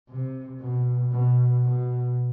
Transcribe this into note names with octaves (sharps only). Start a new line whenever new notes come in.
C3
B2
B2
B2